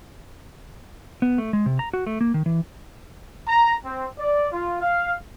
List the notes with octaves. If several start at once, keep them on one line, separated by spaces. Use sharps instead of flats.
B3
A3
G#3
C3
A#5
F#4
A3
A#3
D#3
E3
A#5
C4
D5
F4
F5